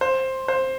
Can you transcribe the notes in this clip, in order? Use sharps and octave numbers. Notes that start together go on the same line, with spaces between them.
C5
C5